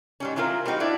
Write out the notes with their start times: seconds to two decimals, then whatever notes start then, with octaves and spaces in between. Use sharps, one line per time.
0.20 G#2 G3 C#4
0.36 E3 F#3 C4 F4 A#4
0.65 G3 A#3 C4 D#4 F#4
0.80 D4 E4 D5